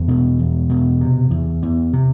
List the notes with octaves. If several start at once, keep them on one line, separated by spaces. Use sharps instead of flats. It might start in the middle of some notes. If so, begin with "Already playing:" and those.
Already playing: E2 G3
B2
E2
B2
C3
E2
E2
C3